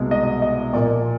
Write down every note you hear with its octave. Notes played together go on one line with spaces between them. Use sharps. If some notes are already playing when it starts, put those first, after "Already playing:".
Already playing: C2 B2 G#3
D#5
D#5
A#2 F3 A#3 D5